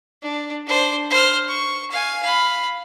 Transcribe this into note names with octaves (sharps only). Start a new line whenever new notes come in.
D4
D4 C5
C5 F6
C#6
F5 G#5
F5 B5